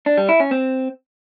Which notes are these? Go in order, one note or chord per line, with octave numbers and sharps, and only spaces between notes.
D4
G3
E4
C#4
C4